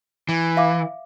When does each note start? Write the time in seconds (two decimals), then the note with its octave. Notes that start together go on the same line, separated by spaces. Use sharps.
0.29 E3
0.57 E5 F5 D6